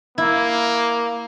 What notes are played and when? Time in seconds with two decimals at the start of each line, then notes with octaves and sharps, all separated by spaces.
0.18 A#3 E4